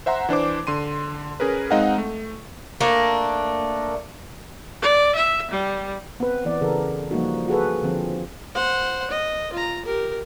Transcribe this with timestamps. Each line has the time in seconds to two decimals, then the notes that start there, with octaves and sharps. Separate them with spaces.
0.06 C5 E5 F#5 A#5 C6
0.29 E3 D4 C5 D6
0.67 D3 C6 D#7
1.40 C#4 G#4 A#4 B4
1.71 G#3 C4 D#4 D#5 F5 F#5
1.98 A3
2.81 A3 A#3 D4
4.82 D5
5.15 E5
5.51 G3
6.20 B3 C4 B4
6.45 E3 B3 D5
6.61 C#3 E3 A4 A#4
7.11 F3 G3 A#3 D#4 F#4
7.48 F#4 G#4 A4 B4
7.83 D3 F3 C4
8.55 C5 F#5
9.11 D#5
9.53 F4 A#5
9.85 G4 A#4